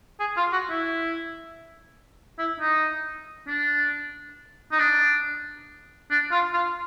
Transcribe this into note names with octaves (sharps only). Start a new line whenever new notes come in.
G#4
F4
F#4
E4
E4
D#4
D4
D#4
D4
D4
F4
F4